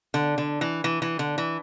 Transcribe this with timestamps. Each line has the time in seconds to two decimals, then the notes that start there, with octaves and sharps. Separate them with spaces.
0.14 D3
0.38 D3
0.61 E3
0.84 E3
1.02 E3
1.19 D3
1.38 E3